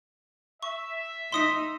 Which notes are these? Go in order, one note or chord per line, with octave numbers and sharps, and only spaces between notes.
E5 C#6
D#4 D#5 C6 D#6 B6